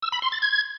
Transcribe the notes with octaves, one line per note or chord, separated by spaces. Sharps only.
E6
B5
C6
A6
G#6